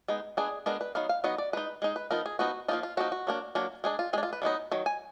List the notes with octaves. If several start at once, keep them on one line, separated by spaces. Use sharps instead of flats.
G#3 B3 D#4
G#3 B3 D4 G#4
G#3 B3 D4 A#4
B4
F#3 B3 D#4 F5
F5
F#3 B3 D#4 D#5
D5
G#3 D#4 B4
G#3 D#4
B4
F3 B3 D#4 A#4
G#4
F3 B3 D#4 F#4
F3 A#3 D#4 F4
F4
F3 A#3 D#4 F#4
F#4
F#3 A#3 D4
F#3 A#3 D4
G#3 D4 G#4
F4
G#3 D4 G#4
F4
B4
D#3 F#3 B3 D#4
D#3 F#3
G#5